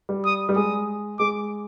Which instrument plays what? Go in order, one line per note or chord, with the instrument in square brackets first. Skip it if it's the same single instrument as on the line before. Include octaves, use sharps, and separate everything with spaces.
[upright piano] G3
[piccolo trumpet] D#6
[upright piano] G3
[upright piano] G#3 [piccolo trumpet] D#6
[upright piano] G#3 [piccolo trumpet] D6